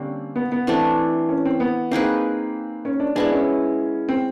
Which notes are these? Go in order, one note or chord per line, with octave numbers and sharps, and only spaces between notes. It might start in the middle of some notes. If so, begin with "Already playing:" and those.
Already playing: D3 G3 A#3 C4 C#4
B3
B3
E3 A3 C4 D4
C#4
C4
B3
A#3 C4 D#4 G#4 B4
C#4
D4
G#3 B3 D4 E4
C#4
C4